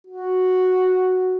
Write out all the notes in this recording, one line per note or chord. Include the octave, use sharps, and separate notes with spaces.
F#4